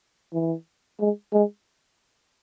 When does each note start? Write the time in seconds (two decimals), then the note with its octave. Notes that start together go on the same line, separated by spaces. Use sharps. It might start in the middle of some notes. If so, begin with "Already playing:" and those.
0.33 E3
1.00 G#3
1.33 G#3